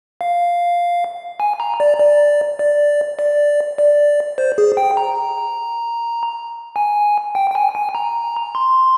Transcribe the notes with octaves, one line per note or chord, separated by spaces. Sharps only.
F5
G#5
A#5
D5
D5
D5
D5
D5
C5
G#4
G5
A#5
G#5
G5
G5
G#5
G#5
A#5
C6